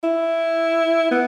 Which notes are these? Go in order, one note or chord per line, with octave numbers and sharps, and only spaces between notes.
E4
B3